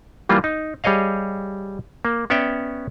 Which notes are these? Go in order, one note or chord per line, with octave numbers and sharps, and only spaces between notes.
E3 G3 A#3 F4
D#4
G3 G#4 C#5 D#5 F5
A#3
B3 C#4 C#5 D5 E5 G5